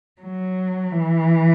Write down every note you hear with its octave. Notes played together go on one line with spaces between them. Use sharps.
F#3
E3